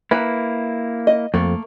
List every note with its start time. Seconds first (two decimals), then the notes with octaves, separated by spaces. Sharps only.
0.11 A#3 E4 B4 A#5
1.07 D#5
1.34 F2 A3 A#3